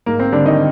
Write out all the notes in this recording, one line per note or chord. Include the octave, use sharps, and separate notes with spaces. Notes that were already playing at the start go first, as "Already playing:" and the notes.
G#2 A#3
C4
D3 G3 D4
D#3 D#4